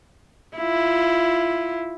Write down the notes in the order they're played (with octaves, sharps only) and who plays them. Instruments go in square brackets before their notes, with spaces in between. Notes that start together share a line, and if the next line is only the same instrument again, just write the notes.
[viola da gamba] E4 F4